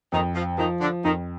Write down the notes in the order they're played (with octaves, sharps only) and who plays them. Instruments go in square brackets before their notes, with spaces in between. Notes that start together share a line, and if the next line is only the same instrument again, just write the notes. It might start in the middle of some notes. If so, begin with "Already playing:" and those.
[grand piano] F2 [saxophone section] D#3 D#4
[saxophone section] F3 F4
[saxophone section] D#3 D#4 [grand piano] F3
[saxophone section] D3 D4
[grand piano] F2 [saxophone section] D#3 D#4